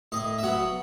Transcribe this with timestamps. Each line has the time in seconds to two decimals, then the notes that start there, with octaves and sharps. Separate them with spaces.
0.12 A2 D#5
0.38 E5
0.43 F#3 B3 F#5